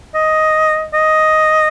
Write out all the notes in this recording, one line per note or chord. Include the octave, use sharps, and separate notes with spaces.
D#5
D#5